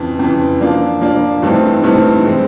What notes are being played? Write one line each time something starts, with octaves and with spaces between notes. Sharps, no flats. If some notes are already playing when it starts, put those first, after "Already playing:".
Already playing: F2 C#3 E3
F2 C#3 E3
F3 A#3 D4
F3 A#3 D4
G2 E3 A3 C4 D#4
G2 E3 A3 C4 D#4
E3 G#3 C4